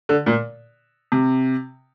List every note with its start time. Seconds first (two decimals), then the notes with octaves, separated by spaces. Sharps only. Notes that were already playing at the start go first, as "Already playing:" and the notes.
0.09 D3
0.26 A#2
1.12 C3